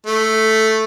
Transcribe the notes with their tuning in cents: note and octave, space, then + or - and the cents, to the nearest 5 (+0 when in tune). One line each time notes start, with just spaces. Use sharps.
A3 +0